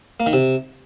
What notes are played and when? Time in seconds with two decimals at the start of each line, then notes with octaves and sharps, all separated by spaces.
0.20 A#3
0.26 D#3
0.33 C3